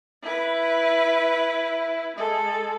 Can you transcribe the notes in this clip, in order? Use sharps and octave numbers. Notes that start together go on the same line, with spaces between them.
E4 B4
G#3 A4